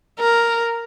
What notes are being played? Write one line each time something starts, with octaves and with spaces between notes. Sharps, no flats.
A#4